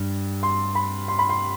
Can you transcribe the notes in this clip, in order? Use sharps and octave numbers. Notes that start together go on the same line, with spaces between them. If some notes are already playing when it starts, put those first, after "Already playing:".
Already playing: G2
C6
B5
C6
B5
C6